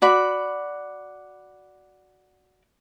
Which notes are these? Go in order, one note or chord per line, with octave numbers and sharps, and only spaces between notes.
F#4 D5 B5